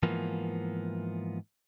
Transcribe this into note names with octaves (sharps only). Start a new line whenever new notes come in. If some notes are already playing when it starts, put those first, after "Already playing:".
G#2 E3 F3 A#3 B3